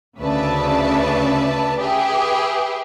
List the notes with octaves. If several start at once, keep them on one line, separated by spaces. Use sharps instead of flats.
D2 C#3 B4 D5 E5 A5
G4 G#4 B4 E5